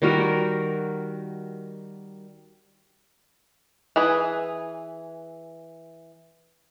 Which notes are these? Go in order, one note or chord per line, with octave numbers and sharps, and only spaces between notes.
D#3 G3 F#4 A#4
E3 G#4 B4